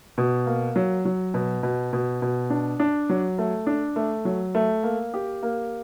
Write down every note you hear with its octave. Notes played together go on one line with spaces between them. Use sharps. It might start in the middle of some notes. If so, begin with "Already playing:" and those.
B2
A#3
F#3
F#3
B2
B2
B2
B2
D4
D4
F#3
A3
D4
A3
F#3
A3
A#3
G4
A#3